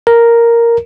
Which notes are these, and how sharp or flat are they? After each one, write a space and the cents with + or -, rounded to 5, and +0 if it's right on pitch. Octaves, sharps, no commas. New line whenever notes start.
A#4 +0